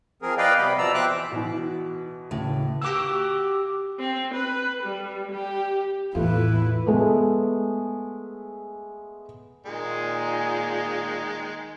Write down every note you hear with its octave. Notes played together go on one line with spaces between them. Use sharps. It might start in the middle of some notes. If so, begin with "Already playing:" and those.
F3 C4 G#4 A#4
B4 D5 D#5 F5 G5
C3 G3 B3 B5
B2 F3 D5 A#5 E6
C5 E5 G5 D6 F#6
E3
B2 E3 F#4
D#2 A2 C#3 E4
A#3 F#4 G4 D6 E6
C4
B4
G3
G4
E2 A2 A3 E4 F4 B4
G#3 A3 B3
A#2 D#3 G#3 G#4